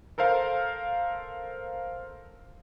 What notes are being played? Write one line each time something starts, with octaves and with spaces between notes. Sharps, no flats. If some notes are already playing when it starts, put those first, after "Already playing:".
A4 A#4 C5 F5